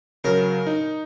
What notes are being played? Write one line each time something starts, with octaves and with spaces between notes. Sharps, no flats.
C#3 F#3 A#4
D#4